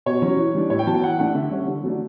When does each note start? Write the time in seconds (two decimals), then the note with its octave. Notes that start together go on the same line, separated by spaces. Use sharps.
0.06 B2 C#5
0.22 F#3 C#4
0.38 E3
0.55 G3 D4
0.70 A2 C#5
0.79 G5
0.87 F#3 B3 A5
0.94 G5
1.04 E3 F#5
1.19 A3 D4 F#5
1.35 D3 E5
1.51 G3 C#4
1.68 D3
1.84 F#3 A3 D4